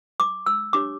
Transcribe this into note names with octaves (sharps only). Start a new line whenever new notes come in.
D6
E6
D4 G4 C#5 D6